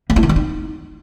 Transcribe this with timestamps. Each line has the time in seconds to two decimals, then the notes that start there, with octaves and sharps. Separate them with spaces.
0.10 A#3
0.16 E4
0.23 D#3
0.29 G3
0.36 D#4